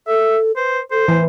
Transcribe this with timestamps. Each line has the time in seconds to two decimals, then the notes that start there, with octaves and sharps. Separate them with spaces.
0.07 A4 E5
0.56 B4 C5
0.91 A4 C5
1.08 E3 B4